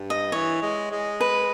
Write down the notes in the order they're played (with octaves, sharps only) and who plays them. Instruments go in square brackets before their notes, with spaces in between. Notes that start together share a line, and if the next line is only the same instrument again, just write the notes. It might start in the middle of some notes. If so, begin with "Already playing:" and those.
Already playing: [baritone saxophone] G2
[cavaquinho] D#5
[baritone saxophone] E3 [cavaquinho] C#5
[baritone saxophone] G#3
G#3
[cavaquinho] B4